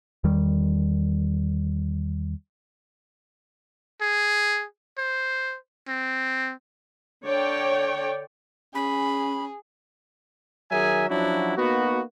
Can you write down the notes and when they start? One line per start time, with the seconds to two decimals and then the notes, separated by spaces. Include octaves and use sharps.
0.24 E2 D#3 G3
4.01 G#4
4.98 C5
5.88 C4
7.24 D3 C#5 D5 G5
8.75 C#4 G#4 B5
10.72 D#3 F#3 G#4 A#4 E5 G#5
11.09 F3 F#3 C#4 D4 E4 F#4
11.57 A#3 B3 D#4 F#4